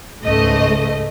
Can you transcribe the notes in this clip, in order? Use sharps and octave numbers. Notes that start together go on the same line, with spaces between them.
C#2 G#2 A3 D#5